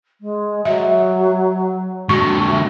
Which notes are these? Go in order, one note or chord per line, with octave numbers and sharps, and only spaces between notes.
G#3
F#3 E5
D3 G#3 F#4 C#6
E5